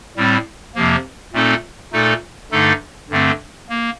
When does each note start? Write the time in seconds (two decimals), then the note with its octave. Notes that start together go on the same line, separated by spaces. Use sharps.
0.16 A2 G3 C4
0.75 F2 C3 F3 A#3
1.33 A#2 A3 C4 D#4 A4
1.92 A#2 A3 D#4 A4
2.52 G2 D3 A3 D#4 A4
3.10 G2 D3 A3 C4
3.69 A#3